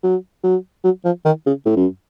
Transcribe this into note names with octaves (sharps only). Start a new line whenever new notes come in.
F#3
F#3
F#3
F3
D#3
C#3
A2
F#2